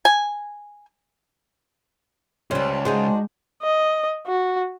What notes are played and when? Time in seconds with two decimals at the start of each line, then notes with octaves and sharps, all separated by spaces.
0.05 G#5
2.51 C#2 G#2 G3 C#4 D4 C5
2.85 G#3 D4 D#4 F#4 G#4 C5
3.63 D#5
4.27 F#4